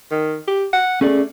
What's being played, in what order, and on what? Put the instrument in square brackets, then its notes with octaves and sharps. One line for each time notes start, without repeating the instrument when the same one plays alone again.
[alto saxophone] D#3
G4
F#5
[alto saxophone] A3 [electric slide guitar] C#4 G#4 D5